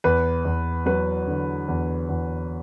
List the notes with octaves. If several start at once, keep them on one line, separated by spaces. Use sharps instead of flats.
E2 B4
E2
F#3 B4
D3
E2
E2